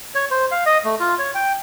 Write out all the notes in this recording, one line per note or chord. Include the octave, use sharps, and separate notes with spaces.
C#5
C5
F5
D#5
A3
F4
C#5
G5